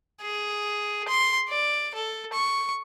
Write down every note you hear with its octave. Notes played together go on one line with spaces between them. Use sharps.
G#4
C6
D5
A4
C#6